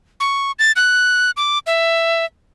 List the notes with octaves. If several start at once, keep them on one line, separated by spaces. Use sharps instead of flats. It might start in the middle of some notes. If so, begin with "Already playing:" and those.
C#6
A6
F#6
D6
E5